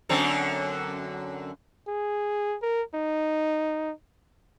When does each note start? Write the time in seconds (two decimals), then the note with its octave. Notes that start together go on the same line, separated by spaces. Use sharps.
0.09 F#2 D3 C4
1.88 G#4
2.62 A#4
2.95 D#4